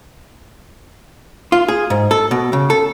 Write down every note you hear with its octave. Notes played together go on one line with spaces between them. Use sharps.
F4
G#4
G#2
A4
B2
C#3
A4